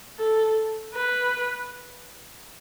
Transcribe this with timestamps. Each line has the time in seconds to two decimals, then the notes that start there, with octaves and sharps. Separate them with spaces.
0.18 A4
0.95 B4